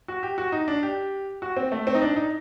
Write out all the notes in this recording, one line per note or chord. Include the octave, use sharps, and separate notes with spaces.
F#4
G4
F#4
D#4
D4
G4
F#4
C4
A3
C4
D#4
D4
D#4